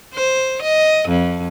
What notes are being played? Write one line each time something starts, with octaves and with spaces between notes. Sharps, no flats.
C5
D#5
F2